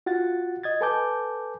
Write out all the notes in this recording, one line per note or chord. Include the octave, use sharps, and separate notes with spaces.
F4 F#4 F#5 A6
D#5 G#6 A6
A4 B4 G#5 A5 D6 G6